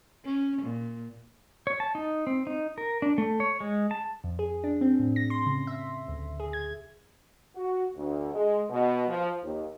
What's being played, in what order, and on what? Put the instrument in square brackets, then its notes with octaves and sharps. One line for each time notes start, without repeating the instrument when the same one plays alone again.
[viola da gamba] C#4
A#2
[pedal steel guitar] C#5
A5
D#4
C4
D#4
A#4
D4
A3
C#5
G#3
A5
[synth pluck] F2
G#4
D4
C4
A2
A#6
C6
C#3
E5
D2
G#4
G#6
[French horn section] F#4
D2
G#3
B2
F3
D#2